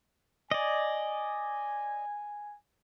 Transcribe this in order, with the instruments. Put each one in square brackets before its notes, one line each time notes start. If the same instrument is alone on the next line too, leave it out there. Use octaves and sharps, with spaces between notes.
[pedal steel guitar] D5 D#5 [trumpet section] G#5